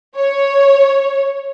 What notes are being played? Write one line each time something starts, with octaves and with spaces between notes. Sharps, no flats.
C#5